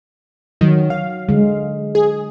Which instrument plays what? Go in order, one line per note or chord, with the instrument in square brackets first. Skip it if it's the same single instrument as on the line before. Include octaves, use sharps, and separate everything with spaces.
[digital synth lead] D#3 [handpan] F#3
[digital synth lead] F5
[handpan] D3 G#3
[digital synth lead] G#4